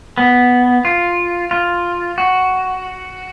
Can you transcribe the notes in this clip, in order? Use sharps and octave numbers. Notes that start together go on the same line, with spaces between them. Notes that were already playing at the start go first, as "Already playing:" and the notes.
B3
F4
F4
F#4